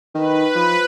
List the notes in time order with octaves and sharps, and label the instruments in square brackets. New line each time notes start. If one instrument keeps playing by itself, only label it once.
[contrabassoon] D#3 [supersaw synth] B4
[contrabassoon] F3